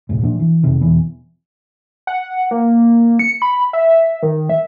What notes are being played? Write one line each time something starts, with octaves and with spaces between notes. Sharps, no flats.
C2 A2
A#2 F3 A#3 D4
E3
F1 C3 D#3
E1 E3 B3
F#5
A#3
C#7
B5
E5
D#3
E5